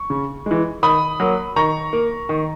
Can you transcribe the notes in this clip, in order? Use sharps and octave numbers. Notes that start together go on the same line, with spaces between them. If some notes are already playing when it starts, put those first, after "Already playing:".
Already playing: C#6
C#3
E3 G#3
D#3 B5 D#6
F#3 A#3
D#3 A#5 C#6
A#3
D#3